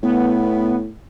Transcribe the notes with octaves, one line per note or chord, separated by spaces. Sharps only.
A2 B3